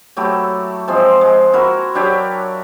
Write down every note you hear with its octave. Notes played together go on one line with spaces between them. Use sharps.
F#3 A3 E4 G4
F3 G#3 C4
G#3
E4 F#4 A#4
F#3 D4 G4 C#5